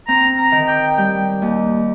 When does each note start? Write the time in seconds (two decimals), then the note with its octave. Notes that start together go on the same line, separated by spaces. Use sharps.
0.08 C4 A#5
0.38 A#5
0.52 D#3
0.68 G5
0.97 G3 G5
1.42 D#2